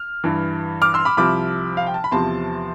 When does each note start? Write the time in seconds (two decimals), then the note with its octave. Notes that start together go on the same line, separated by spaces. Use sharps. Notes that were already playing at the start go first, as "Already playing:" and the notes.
Already playing: F6
0.24 G2 E3
0.82 D6 F6
0.94 C6 E6
1.05 B5 D6
1.17 C2 C3 F3 B5 D6
1.77 F5
1.86 G5
1.94 A5
2.04 B5
2.12 E2 C3 F3 A5 C6